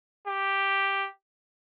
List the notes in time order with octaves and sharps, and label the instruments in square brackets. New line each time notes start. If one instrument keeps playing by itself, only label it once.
[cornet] G4